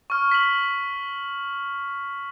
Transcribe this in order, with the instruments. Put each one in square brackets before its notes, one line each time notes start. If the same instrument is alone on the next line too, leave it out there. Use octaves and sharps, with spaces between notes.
[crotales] C#6 F6
B6 F#7